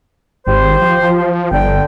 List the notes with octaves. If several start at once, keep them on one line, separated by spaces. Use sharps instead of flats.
G#1 G4 C5
F3
G1 D3 G5